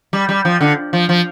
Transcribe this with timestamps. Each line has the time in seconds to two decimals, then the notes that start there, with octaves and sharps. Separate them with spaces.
0.13 G3
0.29 G3
0.45 F3
0.61 D3
0.93 F3
1.09 F3